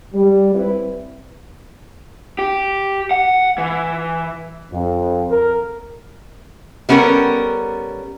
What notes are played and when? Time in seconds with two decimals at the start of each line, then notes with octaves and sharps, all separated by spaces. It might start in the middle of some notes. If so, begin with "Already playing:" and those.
0.14 G3
0.54 C4 E4 B4
2.39 G4
3.11 F#5
3.58 E3
4.73 F2
5.31 A#4
6.89 G3 B3 C#4 A4 A#4